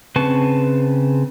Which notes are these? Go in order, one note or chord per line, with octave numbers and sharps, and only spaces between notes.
C#3 C4 B4 A5 C#6